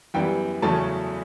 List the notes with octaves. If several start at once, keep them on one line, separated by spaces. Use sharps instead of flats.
F#2 E3 G3 B3 G5
E2 C#3 F#3 A3 C#4 A5